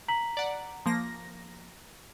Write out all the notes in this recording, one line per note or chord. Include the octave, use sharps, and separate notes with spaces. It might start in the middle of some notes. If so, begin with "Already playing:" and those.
A#5 B6 F#7
D5 F#5
F3 A#3 A#6